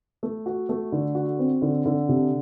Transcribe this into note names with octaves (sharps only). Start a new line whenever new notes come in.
A3
F#4
A3
D3
F#4
C4
D3
D3
C3